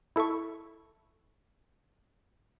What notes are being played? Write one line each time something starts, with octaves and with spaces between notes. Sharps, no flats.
E4 A4 E5 C#6